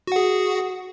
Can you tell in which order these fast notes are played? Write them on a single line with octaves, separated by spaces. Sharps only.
F#4 F#5 G#4